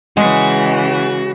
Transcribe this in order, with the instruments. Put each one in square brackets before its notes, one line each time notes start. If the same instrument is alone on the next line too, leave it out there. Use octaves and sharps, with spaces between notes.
[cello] C#3 E3 [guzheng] G#3 [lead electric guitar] F#4